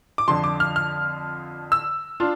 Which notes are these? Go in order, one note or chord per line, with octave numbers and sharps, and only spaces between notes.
D6
F2 D3 F3 C6
D6
F6
F6
E6
D4 F4